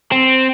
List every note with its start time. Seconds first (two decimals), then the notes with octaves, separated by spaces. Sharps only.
0.12 C4